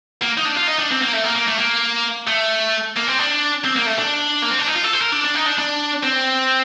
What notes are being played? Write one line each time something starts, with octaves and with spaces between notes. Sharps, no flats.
A#3
D#4
D4
F4
D#4
D4
C4
A#3
A3
A#3
A#3
A3
A#3
A3
A#3
C4
D4
C4
A#3
A3
D4
A#3
C4
D4
D#4
F4
A4
C5
A#4
D4
D4
D#4
D4
D4
C4